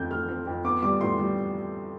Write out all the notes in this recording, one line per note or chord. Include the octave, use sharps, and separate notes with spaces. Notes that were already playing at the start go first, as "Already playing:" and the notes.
Already playing: F2 A3 C4 G6
A3 F6
C4
F2
B3 D6
G3 D6
A2 C6
G3